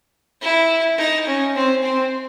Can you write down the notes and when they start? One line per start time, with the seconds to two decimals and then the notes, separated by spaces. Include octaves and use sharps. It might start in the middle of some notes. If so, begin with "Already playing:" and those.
0.41 E4
0.98 D#4
1.27 C#4
1.55 C4
1.83 C4